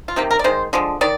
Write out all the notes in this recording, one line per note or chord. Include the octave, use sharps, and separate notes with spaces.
F4
C3 D#3 A#3 G4
A#4
D5
D#3 G#3 C5
D3 F3 G#3
D#3 D5